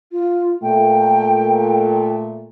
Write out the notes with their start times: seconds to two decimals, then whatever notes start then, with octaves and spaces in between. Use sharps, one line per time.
0.12 F4
0.63 A#2 A3 G5